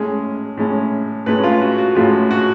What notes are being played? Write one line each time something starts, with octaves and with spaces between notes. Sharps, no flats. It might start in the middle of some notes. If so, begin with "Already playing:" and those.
Already playing: A2 G#3 C#4 G#4
A2 G#3 C#4
A2 G#3 C#4 B4
F4
F#4
F#4
A2 G#3 C#4 F4
F#4